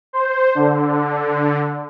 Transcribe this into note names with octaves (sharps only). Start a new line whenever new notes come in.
C5
D3